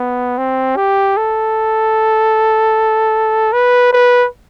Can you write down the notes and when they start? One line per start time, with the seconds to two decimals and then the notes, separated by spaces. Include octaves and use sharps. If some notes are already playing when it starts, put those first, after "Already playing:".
Already playing: B3
0.38 C4
0.77 G4
1.17 A4
3.53 B4
3.93 B4